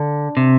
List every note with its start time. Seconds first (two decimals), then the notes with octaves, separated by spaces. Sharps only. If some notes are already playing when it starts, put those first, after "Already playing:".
Already playing: D3
0.37 C3